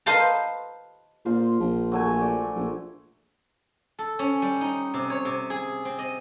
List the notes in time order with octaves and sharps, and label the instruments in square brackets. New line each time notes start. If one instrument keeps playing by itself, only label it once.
[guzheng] B4 C5 D#5 F5 A5 A#5
[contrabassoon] A#2 [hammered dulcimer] F4 C5 C6
[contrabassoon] A#1
[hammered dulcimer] F#3 A3 G#5
D5
[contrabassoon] A#1
[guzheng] A4
C#4
G3
D#4
C3
C#5
C3
G#4
C4
D#5